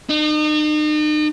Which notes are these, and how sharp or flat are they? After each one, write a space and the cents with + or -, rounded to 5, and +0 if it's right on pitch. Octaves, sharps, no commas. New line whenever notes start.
D#4 -40